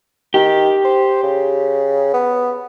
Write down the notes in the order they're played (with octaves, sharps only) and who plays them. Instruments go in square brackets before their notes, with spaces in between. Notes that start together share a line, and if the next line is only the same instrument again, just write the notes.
[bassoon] D#3 [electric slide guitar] G4
[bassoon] C5
C#3
B3